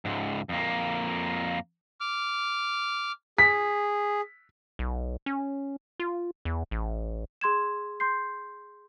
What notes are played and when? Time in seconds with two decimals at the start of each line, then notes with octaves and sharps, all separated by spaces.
0.05 C#2 G#2
0.49 F2 A#3
2.00 D6 F6
3.38 G#4 B6
4.79 B1
5.26 C#4
6.00 F4
6.45 E2
6.71 A1
7.41 G#4 C6 G#6 E7
8.00 C6 G6 C7